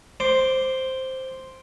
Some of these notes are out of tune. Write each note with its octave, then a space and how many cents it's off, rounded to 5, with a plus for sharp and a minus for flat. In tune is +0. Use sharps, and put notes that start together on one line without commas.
C5 +0 D6 +0